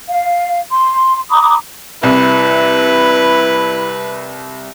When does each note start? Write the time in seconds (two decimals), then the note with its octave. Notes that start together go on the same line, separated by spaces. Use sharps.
0.09 F5
0.71 C6
1.30 A#5 B5 D6 D#6
2.03 C2 E4 B4